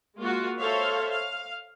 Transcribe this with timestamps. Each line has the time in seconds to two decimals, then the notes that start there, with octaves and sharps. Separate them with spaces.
0.19 G#3 A#3 F4 F#4
0.59 A4 C5 C#5 E5 F5
1.10 F5